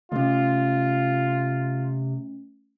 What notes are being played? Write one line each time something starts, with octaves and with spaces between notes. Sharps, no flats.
C3 A3 C#4 F4